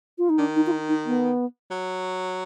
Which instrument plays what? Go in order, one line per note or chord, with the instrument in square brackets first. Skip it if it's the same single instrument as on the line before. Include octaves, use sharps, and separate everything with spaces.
[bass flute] F4
D#4
[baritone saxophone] D#3 [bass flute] D4
[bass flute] D#4
F4
D#4
D#4
B3
[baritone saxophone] F#3